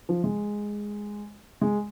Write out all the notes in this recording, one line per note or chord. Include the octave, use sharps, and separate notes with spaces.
F3
G#3
G#3